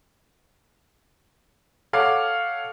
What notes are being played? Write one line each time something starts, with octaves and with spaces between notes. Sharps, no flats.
A4 C#5 F5 F#5 D6